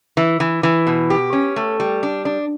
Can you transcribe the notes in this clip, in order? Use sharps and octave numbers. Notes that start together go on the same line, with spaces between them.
E3
E3
E3
B2
G4
C#4
A3
G3
D4
D4